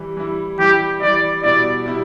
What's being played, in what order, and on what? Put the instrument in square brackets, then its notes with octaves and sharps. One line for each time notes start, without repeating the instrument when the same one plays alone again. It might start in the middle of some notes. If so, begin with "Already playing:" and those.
Already playing: [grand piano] E3 G3 E4
E3 G3 E4
[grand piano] E3 G3 E4 [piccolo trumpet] G4
[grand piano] E3 G3 E4 [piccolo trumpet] D5
[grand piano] B2 G3 E4 [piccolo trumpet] D5
[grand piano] B2 G3 E4